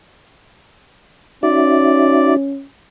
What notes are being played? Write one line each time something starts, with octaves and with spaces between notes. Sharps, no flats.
C#4 D#4 F#4 D5 E5